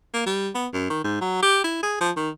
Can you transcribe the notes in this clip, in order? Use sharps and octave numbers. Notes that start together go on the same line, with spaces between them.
A#3
G3
B3
F#2
D#3
G#2
F#3
G4
E4
G#4
F3
D#3